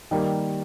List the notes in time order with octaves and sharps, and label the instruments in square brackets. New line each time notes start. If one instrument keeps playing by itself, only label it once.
[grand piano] D#3 G3 A#3